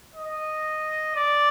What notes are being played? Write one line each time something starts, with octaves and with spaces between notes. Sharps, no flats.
D#5
D5